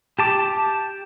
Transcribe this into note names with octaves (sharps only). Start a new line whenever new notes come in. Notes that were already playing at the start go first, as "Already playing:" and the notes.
G4 A5 D6